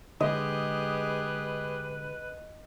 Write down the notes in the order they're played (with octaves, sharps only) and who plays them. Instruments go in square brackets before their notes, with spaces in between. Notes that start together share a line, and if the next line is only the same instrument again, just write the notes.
[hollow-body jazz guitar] D3 G#3 [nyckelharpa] G4 G#4 [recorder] B4 [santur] D#5